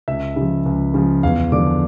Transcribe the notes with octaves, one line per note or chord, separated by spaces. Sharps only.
C#2 E5
C#3
F3
C#2
C#3 F3
E2 F5
D3 F3 D6